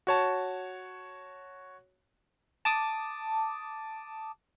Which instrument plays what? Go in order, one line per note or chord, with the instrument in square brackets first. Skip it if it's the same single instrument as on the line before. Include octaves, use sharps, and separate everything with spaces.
[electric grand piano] F#4 C#5 A5
[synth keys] A5 D6 D#6